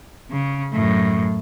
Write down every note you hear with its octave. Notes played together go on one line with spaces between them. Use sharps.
C#3
F#2 A2